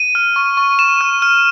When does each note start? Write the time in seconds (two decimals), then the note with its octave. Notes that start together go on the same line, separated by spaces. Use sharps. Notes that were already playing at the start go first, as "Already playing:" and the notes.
Already playing: D#7
0.15 F6
0.36 C#6
0.57 C#6
0.79 C#6 E7
1.01 F6
1.22 F6